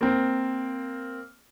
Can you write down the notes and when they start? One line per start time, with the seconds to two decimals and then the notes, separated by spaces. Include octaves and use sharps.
0.01 A#3 C4